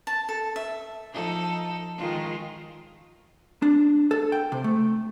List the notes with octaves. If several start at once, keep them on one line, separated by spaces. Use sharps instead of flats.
A5
A4
E5
F3 D#4 A4
D#3 G#3 F4
D4
A4
G5
C3
A3